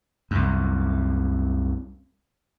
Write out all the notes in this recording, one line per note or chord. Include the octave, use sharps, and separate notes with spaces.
C2 F#2